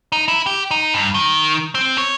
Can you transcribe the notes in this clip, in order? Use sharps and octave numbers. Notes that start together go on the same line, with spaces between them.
D#4
E4
G4
D#4
G2
D#3
C4
C#5